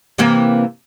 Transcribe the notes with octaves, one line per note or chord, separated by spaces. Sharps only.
C3 E3 A#3